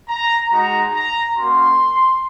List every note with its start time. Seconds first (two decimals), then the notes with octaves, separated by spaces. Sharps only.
0.09 A#5
0.51 G#3 D#4 F#4 A#5
0.94 A#5
1.36 A#3 C#4 F#4 C6